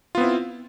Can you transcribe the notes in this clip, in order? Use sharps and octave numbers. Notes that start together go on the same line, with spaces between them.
B3 C4 E4 F4